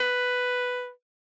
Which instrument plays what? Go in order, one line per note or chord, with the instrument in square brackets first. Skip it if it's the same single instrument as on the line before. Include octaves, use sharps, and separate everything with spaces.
[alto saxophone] B4